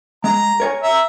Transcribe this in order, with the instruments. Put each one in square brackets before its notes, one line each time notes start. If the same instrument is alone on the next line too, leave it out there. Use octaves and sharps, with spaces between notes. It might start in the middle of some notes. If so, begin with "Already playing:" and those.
[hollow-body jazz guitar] G#3 [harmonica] A#5
[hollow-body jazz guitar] A#4 C#5 G#5
[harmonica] E5 A#5